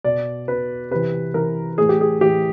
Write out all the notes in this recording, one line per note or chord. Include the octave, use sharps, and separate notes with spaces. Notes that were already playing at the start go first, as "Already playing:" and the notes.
B2 D5
B2 B4
C3 E3 B4
C3 E3 A#4
A2 E3 G#4
G4
G#4
A2 E3 G4